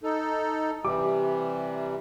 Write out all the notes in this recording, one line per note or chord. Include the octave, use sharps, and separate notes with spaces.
D#4 A4
C3 E3 G3 G4 D6